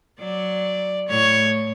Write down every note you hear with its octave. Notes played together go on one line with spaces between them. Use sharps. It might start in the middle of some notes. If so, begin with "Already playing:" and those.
F#3 D5
A2 C#5